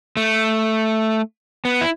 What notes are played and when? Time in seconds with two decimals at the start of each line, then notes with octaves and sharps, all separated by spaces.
0.17 A3
1.65 B3
1.81 E4